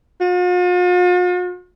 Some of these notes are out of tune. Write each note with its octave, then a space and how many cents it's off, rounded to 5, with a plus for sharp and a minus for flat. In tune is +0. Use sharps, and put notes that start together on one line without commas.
F4 +45